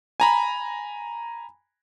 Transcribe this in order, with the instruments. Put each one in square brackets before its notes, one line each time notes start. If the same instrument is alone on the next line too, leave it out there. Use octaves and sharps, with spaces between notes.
[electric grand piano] G#5 A#5 B5